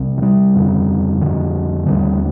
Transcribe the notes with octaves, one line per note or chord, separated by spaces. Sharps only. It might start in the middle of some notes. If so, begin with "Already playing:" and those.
Already playing: C2 C3
F3
G3
F2 D3
F2 D3
D#2 D3 G3